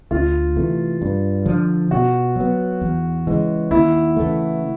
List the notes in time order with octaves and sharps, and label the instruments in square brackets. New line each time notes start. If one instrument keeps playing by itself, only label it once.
[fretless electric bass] D2 [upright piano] F4
[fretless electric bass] C3 E3 A3
G2
D3 F3
[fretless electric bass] B2 [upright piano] F#4
[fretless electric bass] F#3 B3
E2
C#3 E3 G#3
[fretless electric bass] D#2 [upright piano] E4
[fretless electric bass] C#3 E3 A3